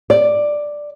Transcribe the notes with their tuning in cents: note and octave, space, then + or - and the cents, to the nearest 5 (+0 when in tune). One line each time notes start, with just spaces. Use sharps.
D5 +5